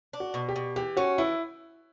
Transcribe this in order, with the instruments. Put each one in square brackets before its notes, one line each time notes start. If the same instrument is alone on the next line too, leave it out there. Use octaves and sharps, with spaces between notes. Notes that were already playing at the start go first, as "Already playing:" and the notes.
[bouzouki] D4
[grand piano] F#4
[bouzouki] B2
[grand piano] G4
[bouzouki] B2
[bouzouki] E3 [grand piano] G4
[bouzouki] C#4 [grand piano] F#4
[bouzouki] E3 [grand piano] E4